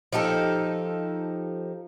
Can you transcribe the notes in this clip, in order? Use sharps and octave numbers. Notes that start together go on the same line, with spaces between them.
F3 D#4 G4 A4